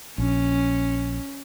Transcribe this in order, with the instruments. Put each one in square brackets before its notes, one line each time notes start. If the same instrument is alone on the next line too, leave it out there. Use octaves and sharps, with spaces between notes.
[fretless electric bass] A#1 [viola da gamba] C#4